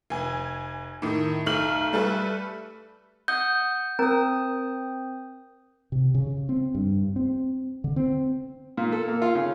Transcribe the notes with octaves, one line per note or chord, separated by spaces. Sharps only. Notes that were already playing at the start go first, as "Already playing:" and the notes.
F1 G#5
A2 D#3
B1 A3 F6 F#7
G3 A3 A4 B4
E5 F#5 D#6 G6
C4 A#4 A#5 D#6
C3
C#3
C4
G2
C4
D3
C4
A#2
A4
A#3
F4
C#3